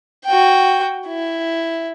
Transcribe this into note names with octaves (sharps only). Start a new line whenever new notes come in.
F#4 G5
E4